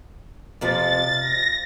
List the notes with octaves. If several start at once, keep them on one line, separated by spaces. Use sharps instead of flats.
F2 C3 F3 A6
A#6